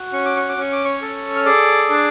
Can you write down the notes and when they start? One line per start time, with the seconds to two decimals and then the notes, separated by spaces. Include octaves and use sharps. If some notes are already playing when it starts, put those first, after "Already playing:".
Already playing: F#4
0.13 C#4 C#6
0.25 D6
0.37 C#6
0.49 D6
0.57 C#4 C#6
0.72 D6
0.84 C#5 C#6
1.02 A4
1.36 F6
1.46 G#4 D5 D6
1.90 D4